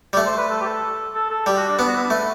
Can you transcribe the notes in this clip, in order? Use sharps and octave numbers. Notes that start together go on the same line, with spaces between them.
G3
A3
C5
B4
A4
G4
A4
A4
A4
G3 G4
F#4
D4
B3 D4
F#4
E4
D4
A3 B4